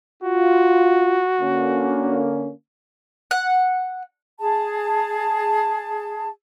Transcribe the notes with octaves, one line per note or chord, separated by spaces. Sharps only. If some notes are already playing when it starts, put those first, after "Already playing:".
F4 F#4
D3 A#3 C#4
F#5
G#4 A5